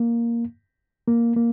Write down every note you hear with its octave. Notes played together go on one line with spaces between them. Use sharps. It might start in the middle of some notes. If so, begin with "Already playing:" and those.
Already playing: A#3
A#3
A#3